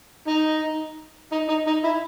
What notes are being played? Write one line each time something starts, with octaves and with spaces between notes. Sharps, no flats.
D#4
D#4
D#4
D#4
E4